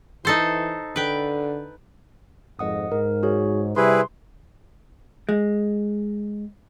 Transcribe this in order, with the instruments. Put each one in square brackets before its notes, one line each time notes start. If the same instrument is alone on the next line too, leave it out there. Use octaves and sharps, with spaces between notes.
[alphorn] E3 [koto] D#4 A4 C5
[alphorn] D3 [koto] B4 G5
[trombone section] G#1 F2 [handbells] D#5 F#5 D#6
[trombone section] G#2 [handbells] A#4
[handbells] F#4 G#4 C#5
[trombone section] C3 G3 [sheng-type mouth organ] E4 G#4 B4 [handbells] C6
[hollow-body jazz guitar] G#3